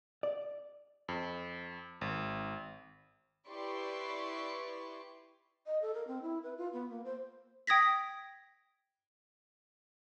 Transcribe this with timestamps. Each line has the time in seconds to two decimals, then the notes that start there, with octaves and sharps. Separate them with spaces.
0.23 D5
1.08 F2
2.01 G#1
3.47 E4 G4 B4 D5 C6 C#6
5.65 D#5
5.82 A4
5.94 A#4
6.07 C4
6.22 E4
6.43 B4
6.58 F4
6.73 B3
6.90 A#3
7.05 C5
7.67 G5 D#6 G#6 A#6 B6